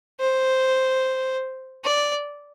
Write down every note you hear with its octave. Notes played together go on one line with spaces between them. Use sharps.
C5
D5